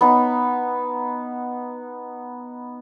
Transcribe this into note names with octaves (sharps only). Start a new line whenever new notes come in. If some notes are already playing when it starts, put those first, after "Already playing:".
B3 D#4